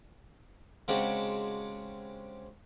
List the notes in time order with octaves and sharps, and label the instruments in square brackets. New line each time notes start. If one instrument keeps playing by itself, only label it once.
[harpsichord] C#3 G#3 C4 D4 F#4 G4